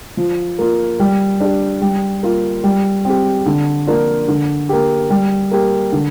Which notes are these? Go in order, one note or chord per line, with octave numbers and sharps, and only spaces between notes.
F3
A#3 F4
G3
D4 G4
G3
A#3 F4
G3
C4 G4
D3
F3 A#3 D4 F4
D3
A#3 G4
G3
A#3 G4
D3